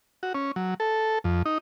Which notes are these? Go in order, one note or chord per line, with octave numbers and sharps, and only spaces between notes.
F#4
C#4
F#3
A4
F2
D#4